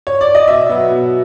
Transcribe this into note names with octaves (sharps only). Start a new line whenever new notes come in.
C#5
D5
D#5
B2 E5
F#3 B3
B2